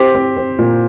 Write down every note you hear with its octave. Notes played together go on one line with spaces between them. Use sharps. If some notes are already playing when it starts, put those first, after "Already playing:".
Already playing: C4 G4 C5
C4
C4
A#2